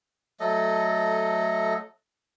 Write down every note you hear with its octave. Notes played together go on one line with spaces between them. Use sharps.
F#3 A3 A4 D#5